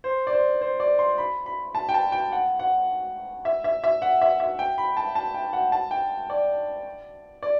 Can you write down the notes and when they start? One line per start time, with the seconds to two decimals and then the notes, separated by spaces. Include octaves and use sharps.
0.04 C5
0.27 D5
0.33 C5
0.61 C5
0.80 D5
0.99 C6
1.18 B5
1.46 B5
1.75 A5
1.89 G5
1.94 A5
2.12 G5
2.32 F#5
2.59 F#5
3.45 E5
3.64 E5
3.84 E5
4.02 F#5
4.22 E5
4.40 E5
4.59 G5
4.78 B5
4.97 A5
5.15 A5
5.34 G5
5.53 F#5
5.72 A5
5.91 G5
6.30 D5
7.43 D5